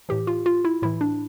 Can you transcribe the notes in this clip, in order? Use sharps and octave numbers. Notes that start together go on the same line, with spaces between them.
A2 E3 G4
F4
F4
E4
A2 E3 E4
D4